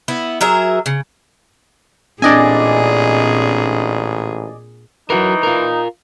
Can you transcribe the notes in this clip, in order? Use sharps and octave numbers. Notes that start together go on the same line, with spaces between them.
B3 E4
F#3 G#4 A#4 E5
C#3
A1 A#2 C4 D4 G#4 D5 D#5 G#5
E3 F#3 D#4 F#4 A#4
F4 A#4